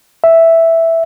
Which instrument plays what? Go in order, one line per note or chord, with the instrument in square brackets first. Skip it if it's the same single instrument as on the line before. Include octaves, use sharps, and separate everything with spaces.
[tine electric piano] E5